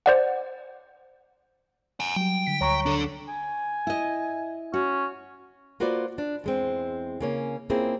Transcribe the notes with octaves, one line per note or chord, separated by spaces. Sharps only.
C5 D5 F#5
F#5 G#5
F#3 G3 G5
D3 B6
D2 C#5 A#5 C#6
D4 A4
G#5
E4 D#5
C#4 F#4
A#3 F4 F#4 B4 C5 D5
D4
E2 G#3 C4
C#3 A#3 C#4
A#3 C4 C#4 E4 F4 G#4